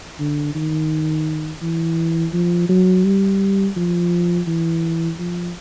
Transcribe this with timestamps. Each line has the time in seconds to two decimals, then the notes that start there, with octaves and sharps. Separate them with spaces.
0.19 D3
0.55 D#3
1.62 E3
2.33 F3
2.69 F#3
3.05 G3
3.76 F3
4.47 E3
5.19 F3